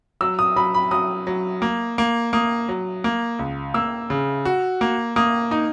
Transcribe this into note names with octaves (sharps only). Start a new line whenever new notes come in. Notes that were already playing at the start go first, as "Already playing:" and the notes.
F#3 E6
D#6
F#3 B5
B5
F#3 D#6
F#3
A#3
A#3
A#3 D#6
F#3
A#3
C#2
A#3 E6
C#3
F#4
A#3
A#3 D#6
D#4